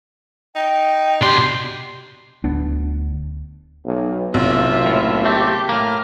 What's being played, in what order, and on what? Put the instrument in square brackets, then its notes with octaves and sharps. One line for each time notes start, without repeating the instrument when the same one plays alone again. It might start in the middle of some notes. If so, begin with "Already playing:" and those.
[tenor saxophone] D#4 [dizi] G5
[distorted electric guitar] B2 C6 [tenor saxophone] D4 [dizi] G4
[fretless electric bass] D1 D2 B3 D4
[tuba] B1
[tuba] F#1 [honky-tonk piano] B1 C3 [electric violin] F4 E5
[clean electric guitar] A2
[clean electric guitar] A3 C4 [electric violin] G4
[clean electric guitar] A2 A#3 [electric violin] F6